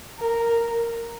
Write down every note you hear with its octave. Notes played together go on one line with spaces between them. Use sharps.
A#4